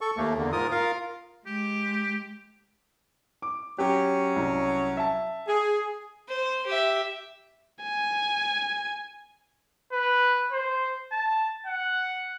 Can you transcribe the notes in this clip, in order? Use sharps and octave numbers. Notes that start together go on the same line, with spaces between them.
A4 C#6
D#2 A3 A#3
E2 D3 A#3
G#2 F4 A#4 D#6
F4 A#4 F5
G#3 G4
D6
F#3 C#4 G4
C2
E5 A5
G#4
C5
G4 E5
G#5
B4
C5
A5
F#5